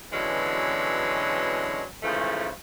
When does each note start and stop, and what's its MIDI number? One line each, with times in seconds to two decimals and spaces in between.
0.13 1.83 47
0.13 1.83 50
0.13 1.83 52
0.13 1.83 54
0.13 1.83 56
0.13 1.83 61
2.03 2.49 44
2.03 2.49 49
2.03 2.49 52
2.03 2.49 53
2.03 2.49 57